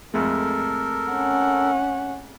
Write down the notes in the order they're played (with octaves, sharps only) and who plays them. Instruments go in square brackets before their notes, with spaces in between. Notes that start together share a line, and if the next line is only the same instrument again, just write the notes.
[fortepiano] F2 G#3 A3 [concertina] A4 A#4
[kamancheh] C#4 F#5